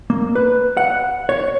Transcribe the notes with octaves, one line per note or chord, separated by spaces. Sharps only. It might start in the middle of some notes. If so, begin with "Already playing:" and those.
A#3
B4
F#5
C#5